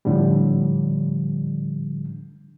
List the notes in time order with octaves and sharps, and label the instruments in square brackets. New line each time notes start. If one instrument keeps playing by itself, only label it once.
[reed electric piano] A2 D3 F3 G3